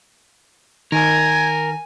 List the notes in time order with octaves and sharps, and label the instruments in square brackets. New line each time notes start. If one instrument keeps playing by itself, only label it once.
[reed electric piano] D#3 [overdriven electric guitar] A#4 [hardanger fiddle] G#5 [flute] G#6